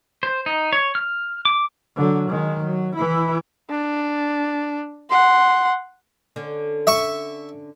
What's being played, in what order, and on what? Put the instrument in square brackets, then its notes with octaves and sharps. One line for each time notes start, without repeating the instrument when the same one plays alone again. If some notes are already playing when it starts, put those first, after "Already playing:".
[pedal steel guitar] C5
D#4
C#5
F6
D6
[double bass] D3 F#3
D#3 G#3
F#3
E3 E4
[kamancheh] D4
F#5 C6
[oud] D3 C#4
[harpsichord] E5 C#6